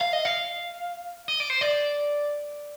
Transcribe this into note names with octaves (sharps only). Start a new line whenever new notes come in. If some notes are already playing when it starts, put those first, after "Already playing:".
F5
D#5
F5
D#5
D5
C5
D5